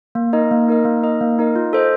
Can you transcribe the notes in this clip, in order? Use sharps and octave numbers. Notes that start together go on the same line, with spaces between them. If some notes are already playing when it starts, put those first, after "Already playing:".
A#3
D#4 A#4 D#5
A#3
D#4 A#4 D#5
A#3
D#4 A#4 D#5
A#3
D#4 A#4 D#5
F4
A4 C5 D#5